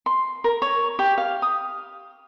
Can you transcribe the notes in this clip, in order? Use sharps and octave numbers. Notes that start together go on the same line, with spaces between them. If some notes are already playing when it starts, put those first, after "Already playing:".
C6
A#4
C#5
G4
F5
D#6